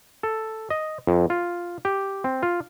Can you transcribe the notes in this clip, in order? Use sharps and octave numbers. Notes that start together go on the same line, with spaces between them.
A4
D#5
F2
F4
G4
C4
F4